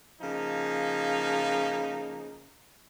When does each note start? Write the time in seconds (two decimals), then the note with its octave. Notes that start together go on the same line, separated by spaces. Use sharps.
0.21 C#3 F3 A#3 D#4